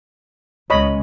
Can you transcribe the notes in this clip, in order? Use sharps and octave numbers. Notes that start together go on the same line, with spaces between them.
C#2 G#3 C#4 C#5 D#5 B5